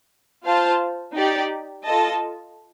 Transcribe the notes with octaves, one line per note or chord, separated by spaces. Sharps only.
F4 C5 F5 A5
D#4 G4 D5
F4 A4 D#5 A5